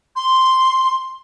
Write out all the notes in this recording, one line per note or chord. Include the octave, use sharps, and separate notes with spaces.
C6